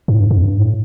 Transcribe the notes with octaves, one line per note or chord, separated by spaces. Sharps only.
G2
A2
G2
G2
F2
G2
A2